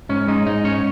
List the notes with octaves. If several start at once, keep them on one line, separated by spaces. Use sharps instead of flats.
G#2 C#4
G#3 D#4
G#2 D#4
C#4 C#5